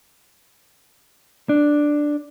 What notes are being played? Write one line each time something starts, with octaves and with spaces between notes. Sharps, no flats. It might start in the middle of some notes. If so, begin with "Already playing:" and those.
D4